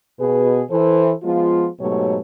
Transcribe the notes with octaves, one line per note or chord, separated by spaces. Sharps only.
B2 G#4 B4
E3 A4 C5
F3 G#3 B3 F4
G#2 B2 F#3 A3 G4 C#5